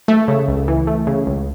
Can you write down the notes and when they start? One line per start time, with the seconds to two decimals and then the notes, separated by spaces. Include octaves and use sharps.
0.08 A3
0.28 C#3
0.48 C#2
0.68 E3
0.87 A3
1.07 C#3
1.27 C#2